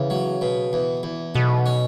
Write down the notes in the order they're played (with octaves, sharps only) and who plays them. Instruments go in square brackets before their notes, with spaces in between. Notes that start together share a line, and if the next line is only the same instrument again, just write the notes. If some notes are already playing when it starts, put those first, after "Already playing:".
Already playing: [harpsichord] E2 [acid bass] C#3
[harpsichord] F#3
B2
E2
E2
[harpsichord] B1 [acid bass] B2
[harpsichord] C#4